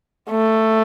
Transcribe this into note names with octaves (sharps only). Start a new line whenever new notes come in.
A3